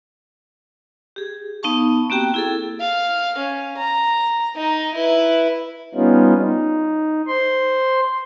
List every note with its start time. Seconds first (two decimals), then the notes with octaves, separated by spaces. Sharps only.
1.16 G4 G#4
1.63 B3 D#4 F5 A5 C#6
2.10 A#3 C4 F#4 G4 G5
2.34 E4 G#4 A4
2.80 F5
3.38 C#4
3.77 A#5
4.56 D#4 D#5
4.94 E4 B4
5.95 G3 B3 C#4 D#4 F4
6.40 D#4
7.28 C5 C6